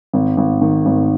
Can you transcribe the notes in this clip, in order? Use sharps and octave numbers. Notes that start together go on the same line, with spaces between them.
G#1
G#1
D#3
G#1